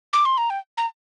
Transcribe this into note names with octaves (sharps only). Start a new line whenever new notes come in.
D6
C6
A#5
G5
A#5